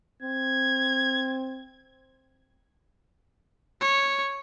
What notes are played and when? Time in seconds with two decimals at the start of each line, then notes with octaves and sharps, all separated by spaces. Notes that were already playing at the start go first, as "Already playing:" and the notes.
0.22 C4 G#6
3.81 C#5